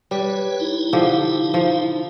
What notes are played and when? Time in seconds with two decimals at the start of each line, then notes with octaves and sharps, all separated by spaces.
0.11 G3 B4 C#5
0.60 D#4 E4
0.93 D3 F3 G4
1.54 F3